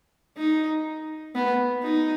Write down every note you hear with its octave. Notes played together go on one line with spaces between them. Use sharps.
D#4
B3
D#4